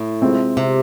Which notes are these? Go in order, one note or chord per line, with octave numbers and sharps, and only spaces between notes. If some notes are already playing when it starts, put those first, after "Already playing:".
Already playing: A2
C3 G#3 C4 F4
C3